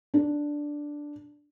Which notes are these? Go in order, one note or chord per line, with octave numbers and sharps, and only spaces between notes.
D4